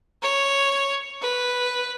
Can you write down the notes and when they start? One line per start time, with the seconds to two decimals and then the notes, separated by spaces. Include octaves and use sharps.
0.22 C#5
1.21 B4